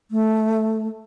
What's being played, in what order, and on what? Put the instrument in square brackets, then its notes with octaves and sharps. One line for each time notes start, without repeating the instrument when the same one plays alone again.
[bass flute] A3